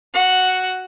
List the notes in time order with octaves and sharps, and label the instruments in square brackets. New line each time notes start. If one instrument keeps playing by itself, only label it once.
[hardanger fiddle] F#4 F#5